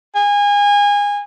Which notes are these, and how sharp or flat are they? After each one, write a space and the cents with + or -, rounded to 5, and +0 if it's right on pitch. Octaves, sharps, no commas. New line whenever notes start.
G#5 -25